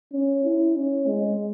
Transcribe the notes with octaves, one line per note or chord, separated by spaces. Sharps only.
C#4
E4
C#4
G#3